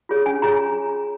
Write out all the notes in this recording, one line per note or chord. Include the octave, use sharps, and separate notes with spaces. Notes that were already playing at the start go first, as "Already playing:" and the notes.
F4 G#4 C#5
C#4 G#5
F4 G#4 C#5 A#5